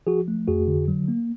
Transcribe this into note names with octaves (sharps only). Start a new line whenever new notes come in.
F3 F#4 G#4
A3
F2 F#4 G#4
D3
F#3
A#3